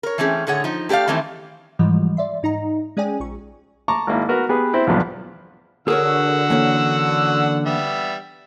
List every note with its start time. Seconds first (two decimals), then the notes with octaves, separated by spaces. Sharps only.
0.03 A#4 C#5
0.18 E3 A3 C4 C#4 G#4
0.47 A2 D3 G#4 C#5 F#5
0.64 F3 D#4
0.89 A3 G4 A#4 D5 F5
1.08 D#3 E3 G3 A3 C4 E4
1.79 G#2 E3 F3 G3 G#3
2.17 D5 E5 C6
2.43 G#2 D#4 D#5 A#5
2.97 G#3 C#4 G#4 D5 G5 G#5
3.20 A#1 C#6
3.88 A5 A#5 C#6 D6
4.07 G#1 A#3 E4
4.28 B3 F#4 A#4 B4
4.49 B3 G4 G#4 B4
4.73 C4 E4 C5
4.87 B1 E2 G2 F3 B3
5.88 D3 F#4 G#4 A#4 C#5 F#5 E6
6.50 E3 A#3 C#4
7.66 G3 B3 E5